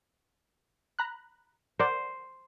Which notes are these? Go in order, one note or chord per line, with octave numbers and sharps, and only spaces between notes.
A#5 B5 F#6
A#4 C5 D5 F#5